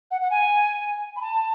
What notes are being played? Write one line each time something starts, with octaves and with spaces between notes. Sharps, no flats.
F#5
F#5
G#5
B5
A5